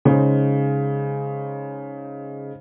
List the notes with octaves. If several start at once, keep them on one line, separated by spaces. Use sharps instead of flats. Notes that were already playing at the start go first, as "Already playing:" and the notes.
C#3 G#3 D#4 C5